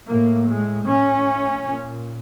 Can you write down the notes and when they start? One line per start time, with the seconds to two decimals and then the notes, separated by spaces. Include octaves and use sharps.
0.08 A2 A#3
0.47 G#3
0.87 A2 C#4
1.65 A#2